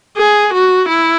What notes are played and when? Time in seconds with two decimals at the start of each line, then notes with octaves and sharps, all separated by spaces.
0.17 G#4
0.53 F#4
0.88 E4